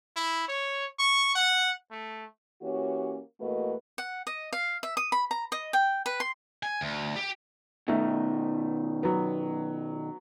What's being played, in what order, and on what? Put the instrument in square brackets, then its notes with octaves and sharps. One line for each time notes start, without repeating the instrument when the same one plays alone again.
[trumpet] E4
C#5
C#6
F#5
A3
[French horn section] E3 A#3 C#4 F#4 G4 C#5
E2 A3 A#3 F#4 B4 D#5
[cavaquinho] F#5
D#5
F5
E5
D#6
B5
A#5
D#5
G5
B4
C6
[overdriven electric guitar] G#5
D2
G4
[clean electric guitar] B2 D#3 [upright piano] A3
[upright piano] F#3 B3